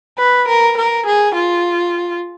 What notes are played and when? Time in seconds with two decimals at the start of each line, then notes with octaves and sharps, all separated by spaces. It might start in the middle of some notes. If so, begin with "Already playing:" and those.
0.18 B4
0.48 A#4
0.78 A#4
1.06 G#4
1.35 F4